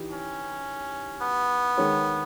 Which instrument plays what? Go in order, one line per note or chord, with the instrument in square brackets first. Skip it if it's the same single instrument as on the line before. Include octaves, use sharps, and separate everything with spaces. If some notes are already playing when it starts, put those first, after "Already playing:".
Already playing: [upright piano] E3 D#4 G4
[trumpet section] C#4
B3
[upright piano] D#3 G#3 D#4 A#4 C#5